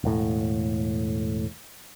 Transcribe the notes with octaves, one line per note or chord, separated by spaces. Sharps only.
E1 A2